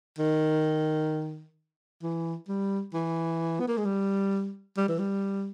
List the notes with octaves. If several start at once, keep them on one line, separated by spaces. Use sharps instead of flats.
D#3
E3
G3
E3
B3
A#3
G#3
G3
G3
E3
G3